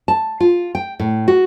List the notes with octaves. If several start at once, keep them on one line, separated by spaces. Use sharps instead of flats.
A5
F4
G5
A2
F#4